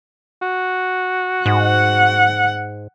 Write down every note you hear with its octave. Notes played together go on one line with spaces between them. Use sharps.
F#4
G#2 F#5